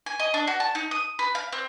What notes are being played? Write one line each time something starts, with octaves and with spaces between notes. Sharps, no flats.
G#5
D#5
D4
F#4
A5
D#4
D#6
B4
F5
C4